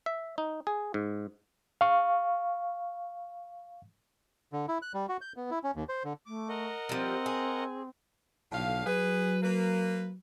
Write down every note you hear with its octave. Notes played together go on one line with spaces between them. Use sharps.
E5
D#4
G#4
G#2
F5 C#6
D3
E4
F#6
G3
F#4
G6
B3
E4
C#4
D#2
C5
D3
A3 D6
A#4 D#5 F#5
F3 G3 C4
G#4
B1 A2 D3 F5
F#3 G#4 B4
A#3 B4